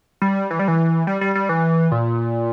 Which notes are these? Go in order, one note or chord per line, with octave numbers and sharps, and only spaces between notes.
G3
E3
G3
E3
G3
G3
G3
E3
A#2